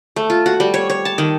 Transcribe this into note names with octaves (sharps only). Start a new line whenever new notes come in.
A3
F4
F#4
G3
C#5
C#5
A5
D#3